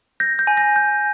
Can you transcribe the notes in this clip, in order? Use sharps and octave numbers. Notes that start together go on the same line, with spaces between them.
G6 A#6
G6
G#5
A#6
G6